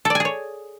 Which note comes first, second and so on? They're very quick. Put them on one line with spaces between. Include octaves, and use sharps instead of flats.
A4 D5 G#5 G#4 C#5